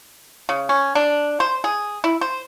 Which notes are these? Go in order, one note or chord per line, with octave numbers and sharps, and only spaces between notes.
C#3
C#4
D4
C5
G#4
E4
C5